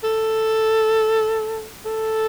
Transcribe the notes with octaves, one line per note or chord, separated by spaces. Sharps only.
A4
A4